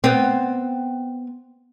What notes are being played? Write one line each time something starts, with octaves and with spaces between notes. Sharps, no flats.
B3 C4